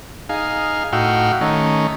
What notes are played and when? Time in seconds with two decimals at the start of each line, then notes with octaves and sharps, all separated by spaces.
0.29 D#4 G#4 F5
0.93 A2 D#4 F#4 F5 G5 E6
1.41 D#3 A3 C#4 D#4